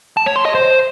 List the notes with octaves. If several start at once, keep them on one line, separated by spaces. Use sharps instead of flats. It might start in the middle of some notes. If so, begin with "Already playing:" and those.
A5
C#5
C6
D#5
C5